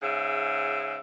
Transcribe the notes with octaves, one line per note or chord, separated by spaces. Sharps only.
G#2 C#3 E5